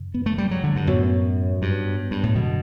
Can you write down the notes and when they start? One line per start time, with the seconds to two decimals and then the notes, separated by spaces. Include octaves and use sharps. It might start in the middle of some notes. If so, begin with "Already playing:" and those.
Already playing: F#2 C#3
0.14 B3
0.26 A3
0.38 G3
0.51 F#3
0.64 D3
0.76 G2
0.87 F#2 A2 F#3 B3 F#4 C#5
1.62 G2
2.11 G2
2.23 A2
2.35 F#2 B2 D3 F#3